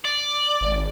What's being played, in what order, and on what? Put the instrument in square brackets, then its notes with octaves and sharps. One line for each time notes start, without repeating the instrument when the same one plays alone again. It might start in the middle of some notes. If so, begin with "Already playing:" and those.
[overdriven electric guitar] D5
[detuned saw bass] G#1